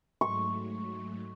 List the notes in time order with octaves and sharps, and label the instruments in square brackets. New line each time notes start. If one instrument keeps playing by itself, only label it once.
[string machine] G#2 F#3 A3 [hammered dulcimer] C#6